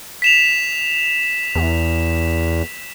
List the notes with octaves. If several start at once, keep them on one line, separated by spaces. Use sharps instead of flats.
B6 E7 F7
E2